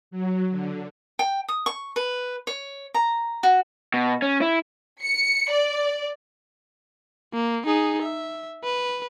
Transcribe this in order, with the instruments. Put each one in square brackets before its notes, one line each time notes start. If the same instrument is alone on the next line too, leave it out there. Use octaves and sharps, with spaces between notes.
[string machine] F#3
D3
[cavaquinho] G5
D#6
C#6
B4
C#5
A#5
F#4
[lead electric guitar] B2
C#4
E4
[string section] C#7
D5
[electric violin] A#3
D#4 G#4
E5
B4